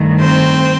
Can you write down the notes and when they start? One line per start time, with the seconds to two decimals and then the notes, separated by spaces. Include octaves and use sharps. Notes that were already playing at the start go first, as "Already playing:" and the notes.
Already playing: G2 D#3 A3
0.19 C4 C5